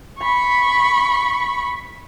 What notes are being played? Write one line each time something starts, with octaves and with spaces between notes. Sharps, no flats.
B5 C#6